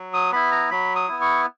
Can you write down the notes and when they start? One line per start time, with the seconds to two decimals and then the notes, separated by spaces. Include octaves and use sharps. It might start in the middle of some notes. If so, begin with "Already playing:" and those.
Already playing: F#3
0.14 D#6
0.32 B3 E4 B5
0.52 A#5
0.71 F#3 B5
0.96 D#6
1.08 B3 E4
1.21 C#6